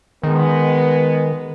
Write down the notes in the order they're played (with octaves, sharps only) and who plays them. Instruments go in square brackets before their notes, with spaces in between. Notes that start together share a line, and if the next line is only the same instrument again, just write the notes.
[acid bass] D#3 [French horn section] G#3 B3